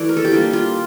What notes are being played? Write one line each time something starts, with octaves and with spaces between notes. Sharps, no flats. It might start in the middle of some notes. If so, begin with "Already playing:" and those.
Already playing: E3 A3 D5
A#4
A4
G4
D3 G3 A#3 F4
F4